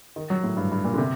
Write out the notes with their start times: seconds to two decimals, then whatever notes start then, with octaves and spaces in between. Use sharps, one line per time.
0.16 D#3
0.30 F#3
0.44 A2
0.57 G2
0.72 G2
0.84 A#2
0.94 D3
0.98 C3